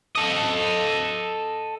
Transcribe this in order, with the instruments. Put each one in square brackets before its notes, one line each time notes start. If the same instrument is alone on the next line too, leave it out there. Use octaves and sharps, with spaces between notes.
[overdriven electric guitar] A4 D#5